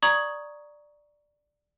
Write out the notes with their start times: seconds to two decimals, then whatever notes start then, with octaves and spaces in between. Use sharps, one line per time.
0.03 D5 A#5 C#6 D#6 G#6 F#7